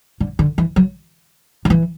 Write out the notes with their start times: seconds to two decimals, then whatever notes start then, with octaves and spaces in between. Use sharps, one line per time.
0.20 D3
0.39 D3
0.58 E3
0.76 F#3
1.65 D3
1.70 E3